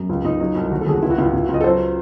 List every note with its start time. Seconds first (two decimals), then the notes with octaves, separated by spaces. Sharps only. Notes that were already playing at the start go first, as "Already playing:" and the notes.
Already playing: F#2
0.09 C#2
0.24 C#2 D#4
0.40 F#3 D#4
0.55 C2
0.71 D#2 F#4
0.81 A4
0.87 D#2 G#4
0.91 F#4
1.02 C#2 E4
1.10 F#4
1.18 C#2 E4
1.33 C#2 E4
1.44 F#4
1.48 C#2
1.54 D#5
1.61 A4
1.64 F#3 C5